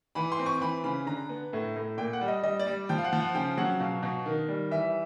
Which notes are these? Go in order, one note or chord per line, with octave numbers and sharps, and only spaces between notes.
E3 B5
C6
C4
C#6
E3 B5
C#3 B5
D3 A#5
B3
A2
A2
A#2 G5
F#5
G3
D#5
G3 D#5
D5
G3
F3 G5
F5
F#5
F3
F#5
C#3 G5
F#3 F#5
B2 F5
B2
D#3
G3
E3 E5